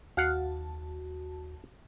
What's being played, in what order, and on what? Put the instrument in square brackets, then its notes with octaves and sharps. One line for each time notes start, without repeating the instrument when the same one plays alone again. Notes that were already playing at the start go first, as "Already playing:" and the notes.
[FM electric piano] D#2 F#4 A5 [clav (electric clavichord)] F5 F#5